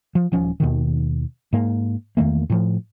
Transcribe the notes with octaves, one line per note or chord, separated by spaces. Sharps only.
F3
D#1 F3 C#4
D#2 B2 D#3
G#2 A#3
E2 D#3 A3 A#3
A2 F3